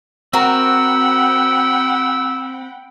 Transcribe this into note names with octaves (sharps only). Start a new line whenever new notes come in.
C4 F#4 A#4 F#5 G5 B5 E6